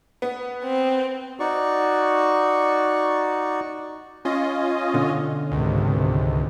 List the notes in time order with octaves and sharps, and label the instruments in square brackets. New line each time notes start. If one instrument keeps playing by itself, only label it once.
[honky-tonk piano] B3
[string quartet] C4
[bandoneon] D#4 F#4 D5 C#6
[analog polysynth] C#4 F4 D#5
[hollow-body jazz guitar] B2 D3
[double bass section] G#1 C3 D#3 [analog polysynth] C#2